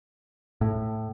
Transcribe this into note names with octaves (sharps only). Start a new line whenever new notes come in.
A2